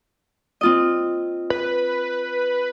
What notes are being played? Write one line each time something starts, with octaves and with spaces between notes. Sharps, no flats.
C4 F4 D#5
B4